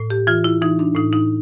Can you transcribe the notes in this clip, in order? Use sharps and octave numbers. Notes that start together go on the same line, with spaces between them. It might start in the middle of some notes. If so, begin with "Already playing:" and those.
Already playing: A2
G4
E3 F4
E4
E3 D#4
D4
A2 D#4
D#4